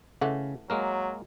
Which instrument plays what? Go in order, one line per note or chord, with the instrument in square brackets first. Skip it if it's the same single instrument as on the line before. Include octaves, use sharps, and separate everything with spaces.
[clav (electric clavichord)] C#3 [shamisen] E3 A3 F#5
[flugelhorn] F#3 [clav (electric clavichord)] G#3 A#3 A#4